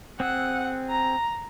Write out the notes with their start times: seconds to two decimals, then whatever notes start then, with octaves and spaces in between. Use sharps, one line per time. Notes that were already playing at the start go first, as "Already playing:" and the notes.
0.20 C4 G#4 F#5 E6
0.90 A#5